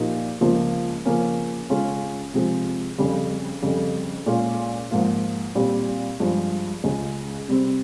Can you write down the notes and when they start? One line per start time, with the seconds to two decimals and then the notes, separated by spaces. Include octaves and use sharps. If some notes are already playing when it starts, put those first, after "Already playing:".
Already playing: A#2 F3 A#3 D#4 G4
0.41 C#2 C#3 F3 A#3 F4
1.05 C#3 F3 A#3 C#4
1.70 C#3 G#3 C#4 F4
2.34 C3 F3 G#3
2.98 F2 C#3 G3
3.62 F2 C#3 G3
4.26 A#2 G#3 C#4 F4
4.91 G#2 F3 A#3 F4
5.55 A#2 G3 C4 G4
6.20 G2 F3 G#3
6.84 C#2 C#3 G#3
7.48 C3 G3 C4